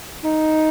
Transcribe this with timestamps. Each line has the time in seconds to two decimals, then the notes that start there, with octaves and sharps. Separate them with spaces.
0.24 D#4